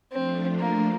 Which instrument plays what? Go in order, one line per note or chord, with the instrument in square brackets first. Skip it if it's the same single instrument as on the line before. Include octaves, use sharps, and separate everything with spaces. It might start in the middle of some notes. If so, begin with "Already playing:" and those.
[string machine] F3 A3 D4 F4 [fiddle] C4
[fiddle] A#3